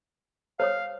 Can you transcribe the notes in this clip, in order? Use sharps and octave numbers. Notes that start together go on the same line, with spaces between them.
C5 C#5 F5 D#6